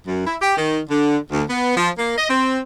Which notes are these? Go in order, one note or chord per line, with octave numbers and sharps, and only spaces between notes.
F#2
E4
G4
D#3
D3
D2
B3
F3
A#3
D#5
C4